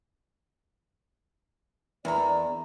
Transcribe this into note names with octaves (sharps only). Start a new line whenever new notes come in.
E2 A#4 D5 A#5 B5